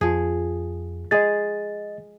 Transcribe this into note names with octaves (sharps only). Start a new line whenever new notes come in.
F2 F3 G#4
G#3 G#4 D#5 A6